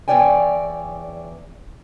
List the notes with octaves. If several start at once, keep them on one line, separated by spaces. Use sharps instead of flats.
E2 A3 C#5 D5 G5 G#5